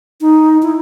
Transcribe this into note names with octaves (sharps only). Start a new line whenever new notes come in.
D#4
E4